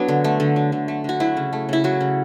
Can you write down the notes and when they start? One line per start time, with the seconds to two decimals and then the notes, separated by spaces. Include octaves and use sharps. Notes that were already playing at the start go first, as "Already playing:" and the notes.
Already playing: F#3 B3 D4
0.08 D3
0.24 A3
0.40 D3
0.56 F#3
0.72 D3
0.88 A3
1.04 D3 F#4
1.20 F#3 E4
1.37 C#3
1.53 A3
1.69 C#3 E4
1.84 F#3 F#4
2.00 C#3